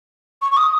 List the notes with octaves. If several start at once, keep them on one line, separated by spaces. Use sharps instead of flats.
C#6
C#6
D#6